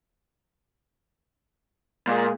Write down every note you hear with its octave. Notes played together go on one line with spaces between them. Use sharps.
A#2 G#3 A#3 G#4